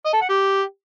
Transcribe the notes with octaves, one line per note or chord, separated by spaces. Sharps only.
D#5
A4
F#5
G4